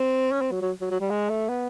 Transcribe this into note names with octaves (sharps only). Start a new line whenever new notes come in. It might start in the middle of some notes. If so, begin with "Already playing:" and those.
Already playing: C4
C#4
C4
F#3
F#3
F#3
F#3
G3
G#3
A3
B3